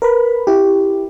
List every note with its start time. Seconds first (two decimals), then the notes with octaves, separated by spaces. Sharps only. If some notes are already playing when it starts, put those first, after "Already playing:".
0.02 A#4 B4 B5
0.47 E4 G4